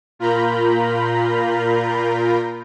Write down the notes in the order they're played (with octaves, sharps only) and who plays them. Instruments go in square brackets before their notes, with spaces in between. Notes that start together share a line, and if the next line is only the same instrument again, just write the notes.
[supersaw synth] A#2 F4 A#4 A#5 B5 G6